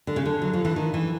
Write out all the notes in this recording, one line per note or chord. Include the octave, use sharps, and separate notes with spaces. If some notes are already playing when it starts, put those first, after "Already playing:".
D3
C#3
D3
F#3
F3
E3
D#3
E3